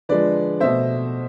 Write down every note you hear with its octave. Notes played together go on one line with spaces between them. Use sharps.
D3 F3 G#3 B4 D5
B2 A3 C5 E5